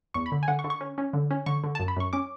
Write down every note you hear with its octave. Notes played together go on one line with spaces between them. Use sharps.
E2 C#6
B5
D3
G#5
D3 F#5
C#6
D3
C#6
C#4
C#4
D3
C#4
D3 C#6
D3
F#2 A5
B5
F#2 C#6
C#4 D6